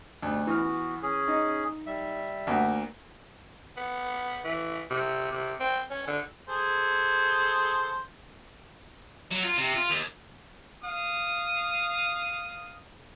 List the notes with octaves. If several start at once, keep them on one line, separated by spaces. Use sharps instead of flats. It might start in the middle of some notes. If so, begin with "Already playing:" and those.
D2 B2 G3
E3 B3 F#4 F6
C#4 G#4
D#4
G3 E5
D2 A#3 F#4
B3
E3
C3
C3
C4
C#4
D3
G#4 A4 C5
F#3
F4
C3
F4
D#2
F5 D#6